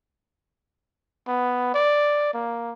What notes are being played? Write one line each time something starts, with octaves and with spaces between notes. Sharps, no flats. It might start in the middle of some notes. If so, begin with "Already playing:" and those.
B3
D5
A#3